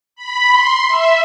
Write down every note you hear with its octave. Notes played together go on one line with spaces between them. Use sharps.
B5
C6
E5